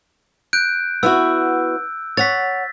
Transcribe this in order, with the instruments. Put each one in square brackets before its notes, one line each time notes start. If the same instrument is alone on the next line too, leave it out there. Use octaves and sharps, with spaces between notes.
[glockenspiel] F#6 G6 D7
[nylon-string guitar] B3 E4 F#4 [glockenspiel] E6
[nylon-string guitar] C#5 F#5 [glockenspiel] A6 B6